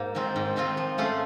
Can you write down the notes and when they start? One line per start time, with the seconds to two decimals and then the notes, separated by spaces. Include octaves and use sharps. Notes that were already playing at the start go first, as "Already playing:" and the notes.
Already playing: G#2 A#3
0.15 D#3 G#3 C4 F4
0.36 G#2
0.56 D#3 G#3 C4 F4
0.77 F3
0.98 A3 C#4 F4 G#4